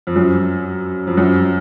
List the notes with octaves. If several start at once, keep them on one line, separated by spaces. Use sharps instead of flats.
F2
F#2
F2
F#2